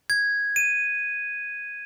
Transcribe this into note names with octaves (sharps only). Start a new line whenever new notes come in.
G#6
D#7